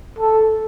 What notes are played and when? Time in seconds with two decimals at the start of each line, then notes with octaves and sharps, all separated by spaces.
0.18 A4